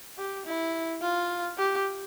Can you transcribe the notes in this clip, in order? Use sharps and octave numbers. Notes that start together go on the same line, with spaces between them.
G4
E4
F4
G4